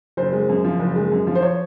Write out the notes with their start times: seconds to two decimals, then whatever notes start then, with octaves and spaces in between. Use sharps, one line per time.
0.17 F#1 C5
0.33 G#3
0.49 F#2
0.64 F3
0.79 F#1
0.96 G#3
1.11 F#2
1.27 F3
1.35 C5
1.42 C#5